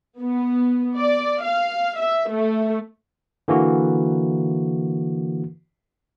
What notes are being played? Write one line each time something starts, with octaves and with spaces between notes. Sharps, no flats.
B3
D5
F5
E5
A3
D3 E3 A#3 F#4